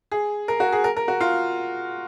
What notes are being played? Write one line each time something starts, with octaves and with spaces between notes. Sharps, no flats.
G#4
A#4
F#4
G#4
A#4
A#4
F#4
F4